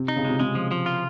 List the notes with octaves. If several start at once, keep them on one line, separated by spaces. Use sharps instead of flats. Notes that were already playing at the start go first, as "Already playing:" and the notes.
Already playing: C3
D#4
C#3
C3 G#3
C#3 G#3
F3
F3
F4